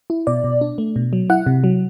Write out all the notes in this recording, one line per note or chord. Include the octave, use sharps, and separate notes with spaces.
E4
B2 D5
B2
D4
A3
B2
F#3
E4 F#5
C3
F#3